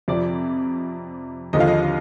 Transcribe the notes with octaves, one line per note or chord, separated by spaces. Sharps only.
F2 C3 F3 D5
D#2 D3 F3 D#5
F5
D#5